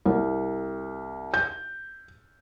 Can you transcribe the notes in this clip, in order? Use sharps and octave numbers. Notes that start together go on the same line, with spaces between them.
C2
G6